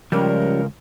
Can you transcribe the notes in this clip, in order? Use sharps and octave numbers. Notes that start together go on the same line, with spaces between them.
C#2 F3 G3 C#4 A#4